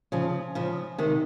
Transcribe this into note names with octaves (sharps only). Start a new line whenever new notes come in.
C#3 F3
C#3 F3
C3 D#3